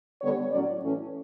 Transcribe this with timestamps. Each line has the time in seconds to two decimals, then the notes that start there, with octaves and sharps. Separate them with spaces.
0.21 D3 G3 B3 C#5
0.51 A2 F#3 C#4 D5
0.81 A2 E3 A3 C#4